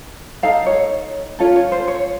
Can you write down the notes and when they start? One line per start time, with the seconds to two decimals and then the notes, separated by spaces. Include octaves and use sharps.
0.43 D#4 A4 F5
0.67 C#5
1.39 C#4 F4 A4 C#5
1.56 C#5
1.72 C5
1.88 C#5